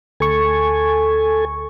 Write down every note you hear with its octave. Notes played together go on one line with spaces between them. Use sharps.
D2 A4 G#5 C#6